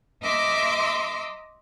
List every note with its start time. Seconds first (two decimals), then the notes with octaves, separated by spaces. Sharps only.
0.23 D#5 E5 A#5 C6 D6 E6